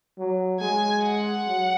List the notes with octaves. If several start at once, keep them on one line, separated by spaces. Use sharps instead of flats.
F#3
G#3 G#5
F#5
F#3